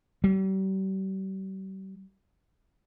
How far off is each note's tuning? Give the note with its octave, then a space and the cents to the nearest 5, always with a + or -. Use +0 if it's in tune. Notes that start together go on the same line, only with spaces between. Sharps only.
G3 -40